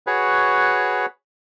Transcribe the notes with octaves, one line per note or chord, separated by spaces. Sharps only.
F#4 G#4 B4 C#5